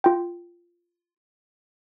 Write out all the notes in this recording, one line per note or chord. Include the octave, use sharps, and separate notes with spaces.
F4 G5